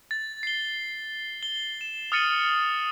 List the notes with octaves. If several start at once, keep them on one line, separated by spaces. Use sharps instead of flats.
A6
C7 G7
G7
E7
D#6 F6 A6 C#7 D#7 F#7